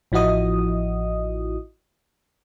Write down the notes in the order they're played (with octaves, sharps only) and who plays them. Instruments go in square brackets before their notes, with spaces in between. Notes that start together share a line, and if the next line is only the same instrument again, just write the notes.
[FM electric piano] A1 F3 E4 F#4 D#5 D#6